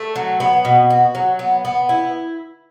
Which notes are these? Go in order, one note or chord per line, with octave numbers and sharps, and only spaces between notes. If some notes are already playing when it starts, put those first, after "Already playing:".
Already playing: A3
F#3
B3
B2
F#4
F#3
B3
B3
E4